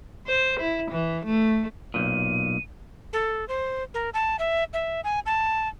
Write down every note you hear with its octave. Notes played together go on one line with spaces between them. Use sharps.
C5
E4
E3
A3
B1 G2 A#2 D#7
A4
C5
A#4
A5
E5
E5
G#5
A5